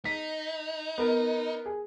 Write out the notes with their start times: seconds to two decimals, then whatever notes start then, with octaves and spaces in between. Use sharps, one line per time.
0.05 D#4 B6
0.98 B3 A#4
1.66 G#4